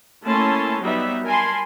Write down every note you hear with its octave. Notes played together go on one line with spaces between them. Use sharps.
A3 A#3 C#4 E4 A5 C6
F#3 G3 B3 D#4 E5
A#4 G#5 A5 B5 C6